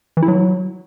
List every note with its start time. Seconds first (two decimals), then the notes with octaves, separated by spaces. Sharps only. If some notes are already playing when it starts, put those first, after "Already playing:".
0.17 E3
0.22 E4
0.28 F#3